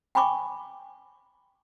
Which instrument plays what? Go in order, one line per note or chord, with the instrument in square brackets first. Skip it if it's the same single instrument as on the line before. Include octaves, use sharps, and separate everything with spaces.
[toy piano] G5 G#5 B5 C#6 D6